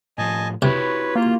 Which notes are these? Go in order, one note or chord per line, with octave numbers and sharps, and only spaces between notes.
A2 F3 D#5 G#5 A5
C3 E4 F#4 G4 B4 C#5
A#3 F4